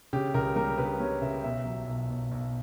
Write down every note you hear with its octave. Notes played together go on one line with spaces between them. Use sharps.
C#3 G4
C#2 A#4
G3 A#4
C#3 B4
G3 C#5
C#3 E5
B1 E5
F#3
B1
B1
B1